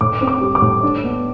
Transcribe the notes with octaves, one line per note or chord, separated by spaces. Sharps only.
A2 D6
C4
D6
G3
D6
A2
D4
B3